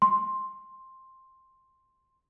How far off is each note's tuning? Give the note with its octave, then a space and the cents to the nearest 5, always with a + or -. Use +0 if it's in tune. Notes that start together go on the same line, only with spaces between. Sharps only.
C6 +10